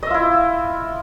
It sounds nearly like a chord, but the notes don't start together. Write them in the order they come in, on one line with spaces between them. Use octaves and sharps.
D#5 E5 F4 E4